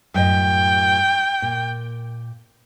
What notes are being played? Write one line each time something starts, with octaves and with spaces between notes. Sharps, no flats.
F#2 A2 D#5 G5
A#2